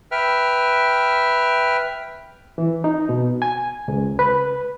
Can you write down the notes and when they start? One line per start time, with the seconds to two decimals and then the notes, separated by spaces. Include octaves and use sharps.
0.11 B4 E5 G5 F6
2.58 E3
2.84 D#4
3.09 B2
3.42 G#5
3.88 C#2
4.19 B4